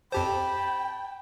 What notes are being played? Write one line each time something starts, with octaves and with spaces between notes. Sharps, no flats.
F2 G4 C5 G5 A5 B5